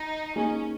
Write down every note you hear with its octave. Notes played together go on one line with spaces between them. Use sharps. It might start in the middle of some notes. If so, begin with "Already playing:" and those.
Already playing: D#4
A#3 C#4 D#4 G#4